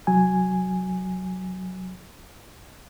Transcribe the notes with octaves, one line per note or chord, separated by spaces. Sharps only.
C2 F#3 G#5